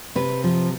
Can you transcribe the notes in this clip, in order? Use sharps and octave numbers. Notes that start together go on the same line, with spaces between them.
C3 B4
F3